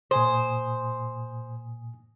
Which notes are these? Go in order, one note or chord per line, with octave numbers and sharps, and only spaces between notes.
A#2 C5 G#5 D#6